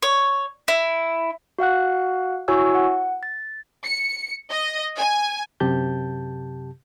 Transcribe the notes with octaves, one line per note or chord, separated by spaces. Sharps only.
C#5
E4
F#4 F5 F#5 F#6
E4 F#4 C#5 G#5 C#6 E6
F#5
A6
C#7
D#5
G#5
F#2 C3 G4 A5 G6